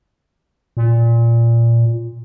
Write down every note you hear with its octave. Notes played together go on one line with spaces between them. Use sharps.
A#2